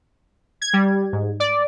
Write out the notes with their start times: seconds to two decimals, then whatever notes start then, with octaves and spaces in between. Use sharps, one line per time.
0.61 G#6
0.73 G3
1.12 G#2
1.40 D5